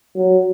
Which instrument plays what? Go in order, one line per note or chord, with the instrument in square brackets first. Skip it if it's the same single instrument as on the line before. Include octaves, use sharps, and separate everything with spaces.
[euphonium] F#3